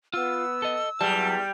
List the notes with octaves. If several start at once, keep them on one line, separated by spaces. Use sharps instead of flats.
B3 F4 E6
A4 D#5
E2 F#3 G3 A5